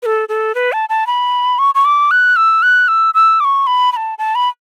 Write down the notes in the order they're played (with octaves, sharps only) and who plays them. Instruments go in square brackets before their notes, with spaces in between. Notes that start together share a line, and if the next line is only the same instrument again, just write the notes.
[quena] B4
A4
A4
B4
A5
A5
B5
C#6
C#6
D6
F#6
E6
F#6
E6
E6
D6
C#6
B5
B5
A5
A5
B5